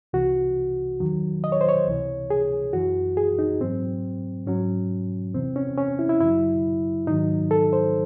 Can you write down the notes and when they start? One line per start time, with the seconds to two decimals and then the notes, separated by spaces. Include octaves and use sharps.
0.13 C2 C3 E3 F#4
1.00 E2 D#3 F#3
1.44 D#5
1.52 C#5
1.61 C5
1.69 C#5
1.87 C#2 C3 E3
2.30 G#4
2.73 F#2 E3 F#4
3.17 G#4
3.39 D#4
3.61 G#2 F#3 C4
4.47 G#2 F#3 C#4
5.34 E2 C3 E3 C4
5.56 C#4
5.77 C#4
5.99 E4
6.09 E4
6.20 F#2 C#3 F#3 E4
7.07 G#2 D#3 F#3 D#4
7.51 A4
7.73 C5